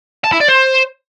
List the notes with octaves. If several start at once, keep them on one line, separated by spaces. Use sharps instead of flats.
A5
E4
D5
C5